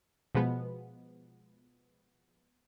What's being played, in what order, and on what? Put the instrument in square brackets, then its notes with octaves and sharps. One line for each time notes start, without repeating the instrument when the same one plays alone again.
[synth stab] B2 F3 G#3 B3